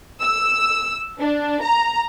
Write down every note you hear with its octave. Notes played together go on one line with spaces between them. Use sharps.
E6
D4
A#5